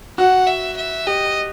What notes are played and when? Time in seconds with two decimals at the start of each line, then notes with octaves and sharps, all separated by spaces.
0.18 F#4 F#5
0.47 E5
0.77 E5
1.07 G4 D#5